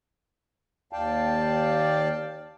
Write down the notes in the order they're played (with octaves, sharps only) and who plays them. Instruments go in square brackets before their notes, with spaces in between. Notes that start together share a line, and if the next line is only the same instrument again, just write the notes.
[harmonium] D#2 D5 F5 G5 A5